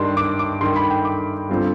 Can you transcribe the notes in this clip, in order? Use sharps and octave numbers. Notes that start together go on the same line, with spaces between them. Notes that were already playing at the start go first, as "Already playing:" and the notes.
Already playing: G2 D#3 G3 D4 C6
D6
D6
G2 D#3 G3 C6
B5
G5
D6
G2 D3 G3 C4 F4